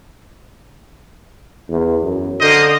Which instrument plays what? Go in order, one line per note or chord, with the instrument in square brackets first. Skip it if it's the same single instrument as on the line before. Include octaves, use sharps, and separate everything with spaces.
[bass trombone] E2
F#2
[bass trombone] D3 [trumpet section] A#3 C5 D#5